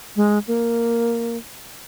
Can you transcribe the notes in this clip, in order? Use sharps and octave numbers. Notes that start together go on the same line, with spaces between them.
G#3
A#3